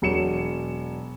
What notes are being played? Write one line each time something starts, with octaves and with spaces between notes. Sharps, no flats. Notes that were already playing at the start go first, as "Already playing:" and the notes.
E1 F#3 C#7 E7